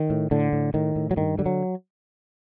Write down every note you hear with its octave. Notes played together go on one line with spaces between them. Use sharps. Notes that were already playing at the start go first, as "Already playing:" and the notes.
Already playing: D#3
A2
A2 D3
A2
A2 D#3
A2
F#3
G2 D#3
D3 G3
F#3